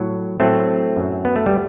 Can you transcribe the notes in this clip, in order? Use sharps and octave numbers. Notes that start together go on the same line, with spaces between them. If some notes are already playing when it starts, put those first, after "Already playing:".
Already playing: A2 F#3
A2 F#3 A3 C4
F#2 F#3
B3
A3
G3